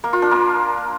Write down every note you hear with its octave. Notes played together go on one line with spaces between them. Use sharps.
A#3
F4
D4
A#3